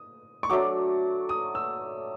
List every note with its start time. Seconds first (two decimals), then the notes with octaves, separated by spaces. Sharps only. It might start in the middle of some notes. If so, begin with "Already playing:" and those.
Already playing: D#6
0.43 C#6
0.50 F#3 A3 D4 D6
1.29 D#6
1.55 E6